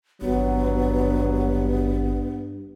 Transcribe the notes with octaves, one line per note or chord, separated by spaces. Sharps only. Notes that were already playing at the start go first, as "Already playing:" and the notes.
G#1 G2 F#3 B3